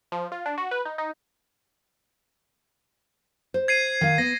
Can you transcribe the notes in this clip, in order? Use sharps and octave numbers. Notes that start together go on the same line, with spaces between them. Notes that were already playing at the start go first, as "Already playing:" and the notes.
F3
F4
D4
F#4
B4
D#4
D#4
C5
G#6 C7 D#7
D#3 F5
B3 A#6